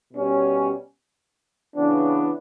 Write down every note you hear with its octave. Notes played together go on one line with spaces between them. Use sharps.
B2 G3 C#4
C#3 E3 B3 D4